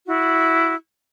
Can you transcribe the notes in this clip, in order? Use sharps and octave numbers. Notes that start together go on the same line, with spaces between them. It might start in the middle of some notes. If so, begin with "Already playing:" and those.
E4 F#4